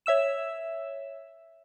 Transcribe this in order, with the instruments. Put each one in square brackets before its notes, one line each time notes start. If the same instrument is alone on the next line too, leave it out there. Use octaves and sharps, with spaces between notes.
[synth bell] C#5 E5 E6 E7